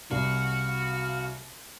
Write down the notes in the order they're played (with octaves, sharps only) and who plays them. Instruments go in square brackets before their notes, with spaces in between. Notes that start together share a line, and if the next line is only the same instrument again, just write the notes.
[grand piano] C2 [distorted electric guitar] F#4 [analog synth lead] F5